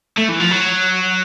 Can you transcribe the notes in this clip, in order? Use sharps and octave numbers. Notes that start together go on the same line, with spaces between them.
A3
E3
F3
F#3